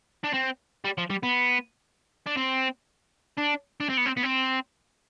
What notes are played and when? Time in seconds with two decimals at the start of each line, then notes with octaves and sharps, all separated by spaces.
0.24 D4
0.34 C4
0.85 G3
0.98 F3
1.10 G3
1.23 B3
2.26 D4
2.37 C4
3.38 D4
3.80 D4
3.89 C4
3.97 B3
4.06 C4
4.17 B3
4.23 C4